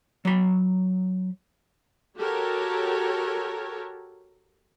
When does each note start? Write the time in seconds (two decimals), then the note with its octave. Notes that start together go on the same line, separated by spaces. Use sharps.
0.25 F#3 B5
2.17 F#4 G4 A4 A#4 C#5